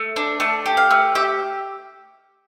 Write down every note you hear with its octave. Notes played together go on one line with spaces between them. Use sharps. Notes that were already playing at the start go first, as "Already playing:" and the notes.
Already playing: A3
D4
A3 A5
G4
F5
A3
G4 E5